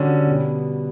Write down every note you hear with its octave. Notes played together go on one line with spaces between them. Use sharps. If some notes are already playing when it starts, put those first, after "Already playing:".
Already playing: D3 G3 C#4 F#4
B2 G3 B3